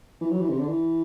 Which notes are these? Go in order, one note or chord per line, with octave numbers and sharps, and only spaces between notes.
E3
F#3
E3
C3
D3
E3